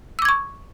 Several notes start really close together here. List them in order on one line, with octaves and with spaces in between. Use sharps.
E6 D6 G#6 C#6